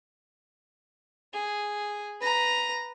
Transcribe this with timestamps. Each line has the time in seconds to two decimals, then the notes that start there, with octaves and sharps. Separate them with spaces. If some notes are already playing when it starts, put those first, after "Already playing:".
1.33 G#4
2.21 B4 A#5